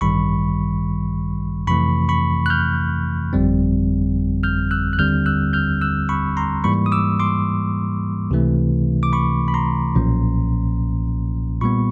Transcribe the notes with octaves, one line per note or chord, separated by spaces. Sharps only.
A1 G2 D#3 G3 B5 C#6
F2 C3 E3 A3 B5 C#6
B5 C#6
F#6
F6 G6
G1 F2 D3 G3 C4
F6 G6
E6 F#6
F#6
D#2 D3 G3 C4 F6 G6
E6 F#6
F6 G6
E6 F#6
B5 C#6
A#5 C6
G#2 E3 G3 A#3 B5 C#6
D#6
D6 E6
C6 D6
C#2 C3 E3 A3
D6
B5 C#6
B5
A#5 C6
B1 A#2 F3 A#3 C#4
A#2 G3 B3 B5 C#6